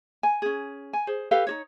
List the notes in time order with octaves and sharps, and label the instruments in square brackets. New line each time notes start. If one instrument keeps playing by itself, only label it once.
[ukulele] G#5
C#4 G#4
G#5
G#4 C5
G4 A4 B4 F5
D#4 F#4 C#5